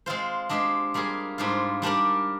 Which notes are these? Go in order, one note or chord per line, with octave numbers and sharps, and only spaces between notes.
G#3 C4 F4 C5
G#3 D4 G4 C5 D#5
G3 A#3 F4 G#4
G#2 G3 D4 F4 C5
G3 D4 G4 A#4 D5